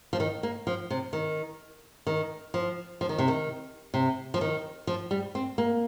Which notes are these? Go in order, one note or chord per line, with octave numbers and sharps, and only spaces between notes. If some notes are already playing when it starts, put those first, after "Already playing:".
F3
D#3
A#3
F3
C3
D#3
D#3
F3
F3
D#3
C3
D#3
C3
F3
D#3
F3
G3
C4
A#3